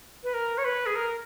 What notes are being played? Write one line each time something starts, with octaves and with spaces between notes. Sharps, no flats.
B4
A#4
C#5
B4
G#4
A#4